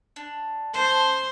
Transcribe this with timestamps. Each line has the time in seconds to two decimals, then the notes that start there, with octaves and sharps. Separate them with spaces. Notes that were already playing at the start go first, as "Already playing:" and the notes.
0.16 D4
0.74 C#4 C5 A5 C6